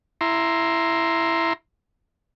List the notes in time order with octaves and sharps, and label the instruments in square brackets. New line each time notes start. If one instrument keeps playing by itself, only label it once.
[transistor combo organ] E4 A#5 C6